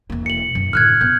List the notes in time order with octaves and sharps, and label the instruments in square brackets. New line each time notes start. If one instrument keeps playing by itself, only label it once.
[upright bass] E1 A#3
[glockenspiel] C#7 F#7
[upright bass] F#2 C#4
[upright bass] A2 D3 [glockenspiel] F6 F#6 G#6
[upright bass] B2 B3 [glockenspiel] G6